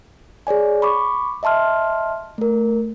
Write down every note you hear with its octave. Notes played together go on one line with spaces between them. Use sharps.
G#4 C#5 D5 G#5
B5 C#6 D6
D#5 E5 A5 C6 F6
A3 A#4